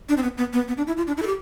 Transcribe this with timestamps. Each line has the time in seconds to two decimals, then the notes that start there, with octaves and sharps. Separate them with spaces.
0.09 D4
0.17 C4
0.23 B3
0.38 B3
0.53 B3
0.68 B3
0.77 D4
0.87 E4
0.97 F4
1.07 D4
1.17 E4
1.22 A4
1.27 G4